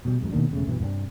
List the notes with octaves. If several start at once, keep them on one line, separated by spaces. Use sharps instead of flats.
B2 G3
A1 F#2 G#3
B2 D#3 A#3 D4
E1 C#3 A3
G2 B2 E3
G2 C3 A#3 D4